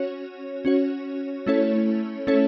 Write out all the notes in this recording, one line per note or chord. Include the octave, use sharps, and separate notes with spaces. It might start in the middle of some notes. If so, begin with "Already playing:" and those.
Already playing: C#4 F#4 C#5
C#4 F#4 C#5
A3 C#4 E4 A4 C#5
A3 C#4 E4 A4 C#5